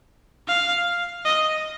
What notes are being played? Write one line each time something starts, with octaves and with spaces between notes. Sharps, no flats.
F5
D#5